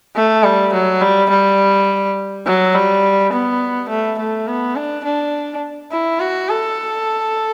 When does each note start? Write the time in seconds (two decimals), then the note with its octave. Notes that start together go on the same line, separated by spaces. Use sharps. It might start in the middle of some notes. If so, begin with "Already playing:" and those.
0.16 A3
0.44 G3
0.74 F#3
1.02 G3
1.30 G3
2.46 F#3
2.75 G3
3.33 B3
3.89 A3
4.19 A3
4.48 B3
4.76 D4
5.05 D4
5.92 E4
6.20 F#4
6.49 A4